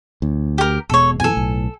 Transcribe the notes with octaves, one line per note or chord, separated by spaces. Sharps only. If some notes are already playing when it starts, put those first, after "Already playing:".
D2
G4 A#4
E1 B2 G#3 A4 C#5
F#2 B2 E3 A4 G#5
B1 A2